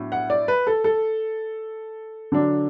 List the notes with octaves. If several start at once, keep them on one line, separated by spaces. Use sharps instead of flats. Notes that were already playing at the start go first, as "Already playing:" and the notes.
Already playing: A2 F#3 B3 D4
F#5
D5
B4
A4
A4
D3 F#3 D4